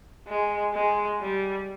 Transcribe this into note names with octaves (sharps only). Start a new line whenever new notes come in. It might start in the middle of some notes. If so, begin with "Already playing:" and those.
G#3
G#3
G3